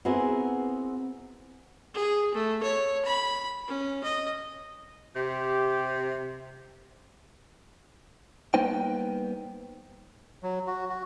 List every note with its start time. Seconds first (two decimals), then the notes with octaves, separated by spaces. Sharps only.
0.05 B3 C4 E4 F#4 G#4 A#4
1.94 G#4
2.34 A3
2.63 C#5
3.05 B5
3.68 C#4
4.03 D#5
5.16 C3 G4
8.54 G3 A#3 B3 D#4 C5 G5
10.43 F#3
10.67 F#4
10.89 F#4